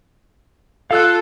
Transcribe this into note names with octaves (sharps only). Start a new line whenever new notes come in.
F4 A4 F5 E6 F#6